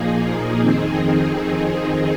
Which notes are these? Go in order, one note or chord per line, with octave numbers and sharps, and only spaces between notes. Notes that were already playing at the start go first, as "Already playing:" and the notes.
Already playing: A#2 F3 A#3 D#4 G#4
F2 D#3 C4 D#4 G#4